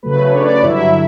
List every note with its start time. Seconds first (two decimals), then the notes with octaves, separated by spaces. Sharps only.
0.03 C#3 F#3 A3 B4
0.18 C#5
0.33 D4 D5
0.48 D4 D5
0.63 G2 D3 F#3 E4 E5